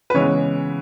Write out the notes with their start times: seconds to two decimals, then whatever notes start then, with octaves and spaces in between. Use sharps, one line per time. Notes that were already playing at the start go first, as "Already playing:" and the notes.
0.10 B4
0.14 C#3 E3 G#3 B3 C#5